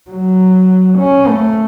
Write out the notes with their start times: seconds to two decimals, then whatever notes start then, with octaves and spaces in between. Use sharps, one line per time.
0.10 F#3
0.99 C#4
1.28 A3